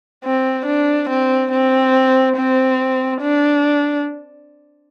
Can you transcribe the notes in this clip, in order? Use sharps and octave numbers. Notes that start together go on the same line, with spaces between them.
C4
D4
C4
C4
C4
D4